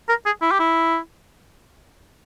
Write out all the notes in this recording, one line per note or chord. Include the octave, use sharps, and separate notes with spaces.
A#4
G#4
E4
G4
E4